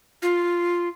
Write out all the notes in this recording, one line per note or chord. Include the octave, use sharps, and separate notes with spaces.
F4